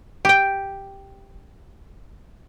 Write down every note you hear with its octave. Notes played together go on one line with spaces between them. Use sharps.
G4 G5